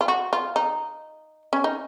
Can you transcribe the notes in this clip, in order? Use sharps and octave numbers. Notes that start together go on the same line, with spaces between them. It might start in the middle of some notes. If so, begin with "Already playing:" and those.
F4
F#4
F4
D#4
C#4
D#4